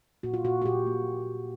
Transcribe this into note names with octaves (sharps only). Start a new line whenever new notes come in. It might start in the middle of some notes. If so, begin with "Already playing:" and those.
A#2 F#4
F4
A#2 F#4
F#4
A#2 G4
A#3